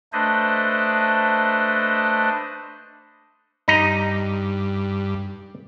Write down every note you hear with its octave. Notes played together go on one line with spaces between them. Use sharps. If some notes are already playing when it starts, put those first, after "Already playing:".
A3 D4 B4 C5 D#5
G2 D#4 D#5 A#5